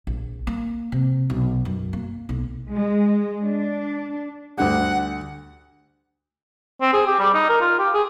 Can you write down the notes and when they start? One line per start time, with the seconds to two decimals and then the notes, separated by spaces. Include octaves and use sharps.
0.07 A#1
0.47 A#3
0.92 C3
1.30 B1
1.65 F#2
1.93 A#3
2.29 B1
2.70 G#3
3.47 D4
4.58 D2 D3 G3 F#5
6.81 C4
6.93 G#4
7.07 G4
7.19 G3
7.34 D#4
7.49 A#4
7.61 F4
7.79 G4
7.94 G#4